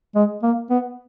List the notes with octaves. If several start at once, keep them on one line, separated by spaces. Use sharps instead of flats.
G#3
A#3
B3